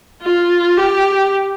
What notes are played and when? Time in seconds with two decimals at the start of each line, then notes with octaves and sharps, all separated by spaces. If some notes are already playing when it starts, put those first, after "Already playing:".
0.22 F4
0.77 G4